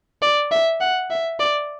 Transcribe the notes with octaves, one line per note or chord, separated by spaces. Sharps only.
D5
E5
F#5
E5
D5